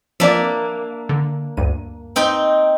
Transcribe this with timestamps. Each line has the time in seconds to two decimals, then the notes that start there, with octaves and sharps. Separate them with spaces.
0.20 F3 A#3 C4 D4 D5 E5
1.09 D3
1.57 D2 G2 D#7
2.16 C4 D#4 G5